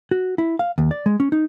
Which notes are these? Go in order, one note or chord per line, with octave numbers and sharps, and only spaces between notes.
F#4
E4
F5
D#2
D5
G#3
C#4
D#4